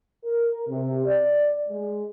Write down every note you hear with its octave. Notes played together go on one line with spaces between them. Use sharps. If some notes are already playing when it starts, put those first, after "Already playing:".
A#4
C3
D5
G#3